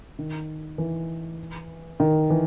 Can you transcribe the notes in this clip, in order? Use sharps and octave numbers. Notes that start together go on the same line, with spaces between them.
D#3
E3
D#3
E3